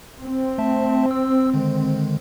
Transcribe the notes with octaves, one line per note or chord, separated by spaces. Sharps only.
C4
A3 E5 A5
E6
D3 D#3 G#3